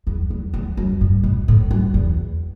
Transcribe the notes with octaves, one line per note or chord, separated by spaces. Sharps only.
E2
E2
E2
F#2
G2
B2
A2
F#2
E2